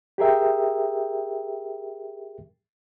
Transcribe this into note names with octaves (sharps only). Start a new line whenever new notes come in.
G4 G#4 A#4 E5 G5